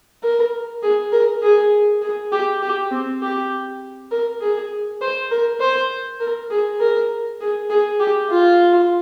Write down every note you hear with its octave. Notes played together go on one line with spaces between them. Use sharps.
A#4
G#4
A#4
G#4
G#4
G4
G4
C4
G4
A#4
G#4
C5
A#4
C5
A#4
G#4
A#4
G#4
G#4
G4
F4